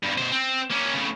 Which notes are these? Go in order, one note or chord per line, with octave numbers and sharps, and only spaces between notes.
E2 G2
B2 C5
C4
A#3 C#4
A2 C#3